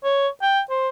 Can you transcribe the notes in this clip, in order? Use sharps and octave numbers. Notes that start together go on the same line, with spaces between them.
C#5
G5
C5